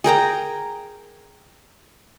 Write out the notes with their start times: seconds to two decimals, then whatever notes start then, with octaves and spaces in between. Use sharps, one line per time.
0.04 G#4 A#4 G5 A#5